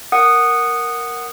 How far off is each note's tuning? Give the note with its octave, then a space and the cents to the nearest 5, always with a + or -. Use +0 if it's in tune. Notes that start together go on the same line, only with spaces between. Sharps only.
A#4 +0 F#5 +0 D#6 -10